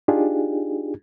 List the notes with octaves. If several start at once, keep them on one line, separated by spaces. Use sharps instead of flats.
D4 D#4 F4 G4 G#4